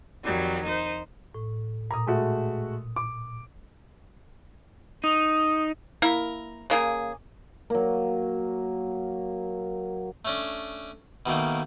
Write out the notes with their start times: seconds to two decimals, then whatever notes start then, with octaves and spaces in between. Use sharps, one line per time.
0.24 F2 D#3 F#3 G3
0.64 D#4 C5
1.34 A2
1.91 A#2 A#5 D#6
2.06 G#3 A3 F#4
2.96 D6
5.04 D#4 D#6
6.02 A#3 E4 A#4
6.70 C#3 A#3 G#4
7.70 F#3 A#3
10.25 A3 C#4 D4
11.26 B2 D#3 A3 A#3